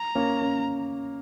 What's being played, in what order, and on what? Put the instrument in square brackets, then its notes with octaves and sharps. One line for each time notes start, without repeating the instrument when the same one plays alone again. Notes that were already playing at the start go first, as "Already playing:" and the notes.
Already playing: [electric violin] A#5
[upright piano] A#3 C#4
C#4